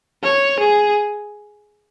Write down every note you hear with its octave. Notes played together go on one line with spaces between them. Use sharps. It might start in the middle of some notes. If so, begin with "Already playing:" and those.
C#5
G#4